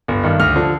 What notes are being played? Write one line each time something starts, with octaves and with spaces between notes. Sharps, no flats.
G1
G2 D#3
D2 F6
D3 F3